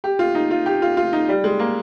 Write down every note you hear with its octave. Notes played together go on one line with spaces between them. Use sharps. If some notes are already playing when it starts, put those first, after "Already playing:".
G4
F4
D#4
F4
G4
F4
F4
D#4
G3
G#3
A#3